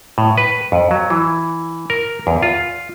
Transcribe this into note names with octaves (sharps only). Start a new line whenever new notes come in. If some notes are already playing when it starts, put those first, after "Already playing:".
A2
B4
F2
F#3
E3
A#4
E2
F4